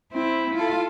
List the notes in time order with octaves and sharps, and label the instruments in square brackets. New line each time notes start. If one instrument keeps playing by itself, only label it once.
[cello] C4 [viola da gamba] E4
[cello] F4 A4